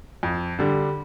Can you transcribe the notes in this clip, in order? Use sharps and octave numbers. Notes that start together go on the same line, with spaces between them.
F2
D3 G3 D4